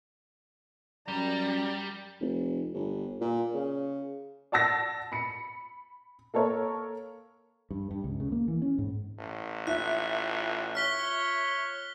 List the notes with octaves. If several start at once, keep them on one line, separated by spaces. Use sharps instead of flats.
F#2 G3 D5 A#5
F1
G1
A#2
C#3
D5 F#5 A5 E6 A6 A#6
B5 C#7
A#3 A4 A#4 C#5
G2
G2
C#2
C#3
A#3
E3
C#4
G#2
A1
F4 E5 F#6
C#5 F6 B6 G7